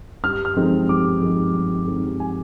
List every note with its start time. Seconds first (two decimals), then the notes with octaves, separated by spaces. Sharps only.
0.24 G2 F6
0.45 F6
0.57 F3 G#3 C4 D#4
0.89 G2 D6
1.22 F3 G#3 C4 D#4
1.54 G2
1.87 F3 G#3 C4 D#4
2.20 G#5